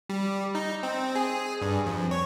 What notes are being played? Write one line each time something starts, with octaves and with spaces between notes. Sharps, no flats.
G3
D#4
C4
G#4
G2
F2
C#5